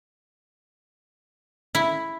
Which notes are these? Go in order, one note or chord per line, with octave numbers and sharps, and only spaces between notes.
E4